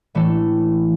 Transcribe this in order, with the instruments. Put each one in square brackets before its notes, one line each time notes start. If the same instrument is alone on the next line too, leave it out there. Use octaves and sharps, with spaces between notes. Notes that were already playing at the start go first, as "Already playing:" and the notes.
[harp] A2 E3 A3 D4 A4